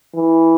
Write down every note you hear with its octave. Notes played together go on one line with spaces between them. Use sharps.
E3